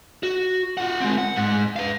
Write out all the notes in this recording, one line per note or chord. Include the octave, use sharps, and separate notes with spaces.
F#4
F4 F#5
G#3 C4
F#5
G#2
B4 F5